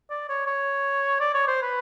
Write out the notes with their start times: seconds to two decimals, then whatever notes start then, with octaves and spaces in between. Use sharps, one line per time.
0.10 D5
0.29 C#5
0.47 C#5
1.20 D5
1.34 C#5
1.48 C5
1.62 B4